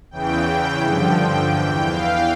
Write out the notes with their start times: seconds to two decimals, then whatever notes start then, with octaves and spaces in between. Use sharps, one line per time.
0.11 E2 C#3 E3 G5
0.81 G2 D3 F3 G5
1.51 E2 E3 G5
1.87 F5